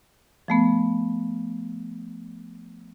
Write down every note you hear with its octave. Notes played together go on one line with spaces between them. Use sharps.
F3 A3 B3